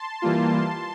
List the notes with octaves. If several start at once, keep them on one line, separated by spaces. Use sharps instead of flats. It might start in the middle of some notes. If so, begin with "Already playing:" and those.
Already playing: A5 C6
E3 G3 A#3 F4